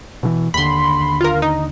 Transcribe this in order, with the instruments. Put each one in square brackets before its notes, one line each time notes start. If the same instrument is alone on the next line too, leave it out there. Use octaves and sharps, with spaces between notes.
[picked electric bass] B2 D3 E3
[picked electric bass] D#2 D3 [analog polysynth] B5 C6
[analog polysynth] F4 A#4
D#4